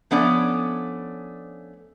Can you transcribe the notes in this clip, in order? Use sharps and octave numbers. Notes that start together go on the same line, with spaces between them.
F3 A3 B3 C#4 D4 D5